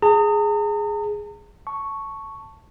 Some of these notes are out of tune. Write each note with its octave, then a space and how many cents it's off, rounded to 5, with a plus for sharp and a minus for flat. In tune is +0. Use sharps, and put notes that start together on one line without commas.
G#4 +0 A#5 -45
A5 +10 C#6 +0